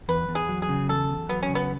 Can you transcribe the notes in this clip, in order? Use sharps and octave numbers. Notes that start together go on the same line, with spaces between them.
E2 B4
E2
G#4
F#3
G#4
C#3
E2 A4
E2
F#3 B3
C#4
C#3
B3